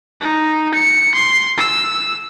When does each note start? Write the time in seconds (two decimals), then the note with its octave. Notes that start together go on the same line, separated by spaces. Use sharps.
0.21 D#4
0.74 C#7
1.14 C6
1.58 E6